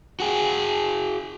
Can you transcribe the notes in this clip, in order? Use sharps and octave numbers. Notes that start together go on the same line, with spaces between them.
F#4 G#4